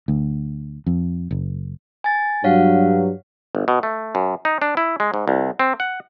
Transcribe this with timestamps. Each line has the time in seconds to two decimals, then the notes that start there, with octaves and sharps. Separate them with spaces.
0.08 D2
0.86 F2
1.31 F#1
2.04 G#5 A6
2.44 G2 F#3 C#5 F5 F#5
3.55 G1
3.68 B2
3.83 A3
4.15 F#2
4.45 D#4
4.62 D4
4.77 E4
5.00 G#3
5.14 G#2
5.28 C2
5.59 C4
5.80 F#5